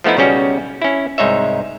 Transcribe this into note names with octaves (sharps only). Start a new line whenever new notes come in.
F3 A3 B3 D#4 E4
B1 C#3 G3 C#4 F#4
C#4 E4
C2 G#2 D#4 C#5 E5